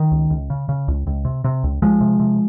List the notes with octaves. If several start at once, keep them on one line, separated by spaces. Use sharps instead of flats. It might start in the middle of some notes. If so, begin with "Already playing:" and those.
Already playing: D#3
C#2
C#2
C#3
C#3
C#2
C#2
C3
C3
C#2
C#2 F3 G#3
C3
C3